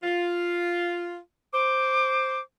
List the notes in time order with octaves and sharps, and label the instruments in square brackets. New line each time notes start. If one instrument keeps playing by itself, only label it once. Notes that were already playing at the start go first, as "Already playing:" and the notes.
[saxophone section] F4
[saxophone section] C5 [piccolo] D6